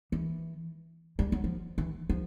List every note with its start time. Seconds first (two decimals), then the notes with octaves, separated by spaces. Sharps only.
0.12 E3
1.19 G3
1.32 F#3
1.44 F3
1.78 E3
2.10 F3